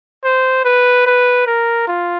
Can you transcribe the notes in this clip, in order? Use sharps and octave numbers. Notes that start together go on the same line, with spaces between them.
C5
B4
B4
A#4
F4